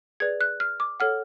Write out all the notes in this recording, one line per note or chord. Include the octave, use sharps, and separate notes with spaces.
G#4 B4 D5 G#6
F#6
F6
D6
A4 C#5 F#5 F6